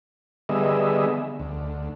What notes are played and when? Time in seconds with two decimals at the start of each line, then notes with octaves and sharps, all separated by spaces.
0.49 D3 G3 B3 G#4 D#5 E5
1.39 D2